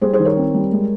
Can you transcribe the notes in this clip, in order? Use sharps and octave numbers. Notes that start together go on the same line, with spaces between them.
G3 G#4 C5
G#4 C5
D#3
A#4 C#5
C4
G3
G#3